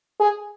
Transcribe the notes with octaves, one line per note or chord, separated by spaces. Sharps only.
G#4